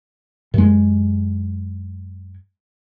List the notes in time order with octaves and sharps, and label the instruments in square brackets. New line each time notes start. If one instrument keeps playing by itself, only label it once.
[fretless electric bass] F#2 G#3